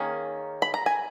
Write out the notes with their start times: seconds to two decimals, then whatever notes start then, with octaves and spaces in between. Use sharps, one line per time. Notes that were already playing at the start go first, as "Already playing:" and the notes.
Already playing: D#3 A#3 C#4 G#4
0.62 B5
0.74 A#5
0.86 G#5